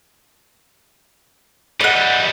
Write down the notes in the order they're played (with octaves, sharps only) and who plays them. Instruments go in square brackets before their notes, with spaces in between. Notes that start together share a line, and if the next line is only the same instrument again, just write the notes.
[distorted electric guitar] E3 G3 [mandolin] D#5 F#5